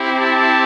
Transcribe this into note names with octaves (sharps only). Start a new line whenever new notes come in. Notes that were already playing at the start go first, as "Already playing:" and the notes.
Already playing: C4 E4 G4
A5